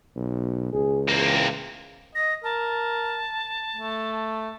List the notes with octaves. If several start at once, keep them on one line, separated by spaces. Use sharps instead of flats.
B1
C#2 G#4
E2 A#3 C4
D#5 A#6
A#4 A5
A3